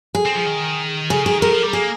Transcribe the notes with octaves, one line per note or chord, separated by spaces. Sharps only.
G#4
C4
F3
D#3
C#3 G#4
D#3 G#4
D#3 A#4
F3
G3
A#3 G#4